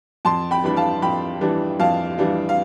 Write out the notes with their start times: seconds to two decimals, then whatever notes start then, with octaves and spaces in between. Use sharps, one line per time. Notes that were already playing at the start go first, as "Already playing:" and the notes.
0.25 F2 A5 C6
0.51 G5 B5
0.64 E3 G3 D4 B5
0.76 F5 A5
1.02 F2 G5 B5
1.41 E3 G3 D4
1.80 F2 F5 A5
2.18 E3 G3 D4
2.49 F5